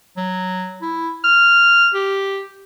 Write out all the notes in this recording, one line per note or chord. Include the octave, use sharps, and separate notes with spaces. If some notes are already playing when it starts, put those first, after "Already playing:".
F#3
E4
F6
G4